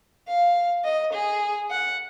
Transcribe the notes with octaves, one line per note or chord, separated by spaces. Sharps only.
F5
D#5
G#4
F#5